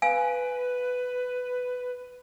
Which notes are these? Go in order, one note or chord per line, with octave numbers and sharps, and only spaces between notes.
B4 F5 G#5